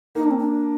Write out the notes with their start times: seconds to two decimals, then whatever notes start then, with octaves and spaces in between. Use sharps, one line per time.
0.15 A#3 D#4
0.23 D4
0.31 C4
0.38 D4